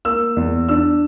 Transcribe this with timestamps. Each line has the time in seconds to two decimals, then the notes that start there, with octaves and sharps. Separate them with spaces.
0.05 A#3 E6
0.37 E2
0.69 D4 E6